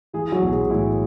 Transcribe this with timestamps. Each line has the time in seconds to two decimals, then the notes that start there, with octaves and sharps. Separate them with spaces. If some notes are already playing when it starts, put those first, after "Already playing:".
0.13 E3 G#3 G#4
0.32 F#3 F#4
0.43 B1
0.52 G#3 G#4
0.70 A2 E3 E4